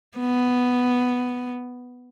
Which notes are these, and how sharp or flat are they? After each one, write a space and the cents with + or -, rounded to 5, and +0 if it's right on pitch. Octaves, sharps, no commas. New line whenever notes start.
B3 +5